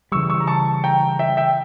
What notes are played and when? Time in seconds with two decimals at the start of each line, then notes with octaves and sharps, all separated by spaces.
0.12 C#3 E3 G3 C#6 E6
0.30 C#6 E6
0.40 A#5
0.47 A5 C#6
0.84 G5 A#5
1.19 E5 G5
1.37 E5 G5